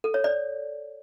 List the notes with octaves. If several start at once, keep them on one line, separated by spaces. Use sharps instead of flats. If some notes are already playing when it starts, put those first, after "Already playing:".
A4
C#5
D5